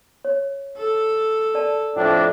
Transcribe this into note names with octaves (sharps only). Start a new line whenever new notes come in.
C#5
A4
A#4 D5 A5
F2 A2 D4